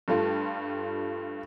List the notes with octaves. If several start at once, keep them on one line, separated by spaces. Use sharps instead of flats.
G2 G3 A3 F4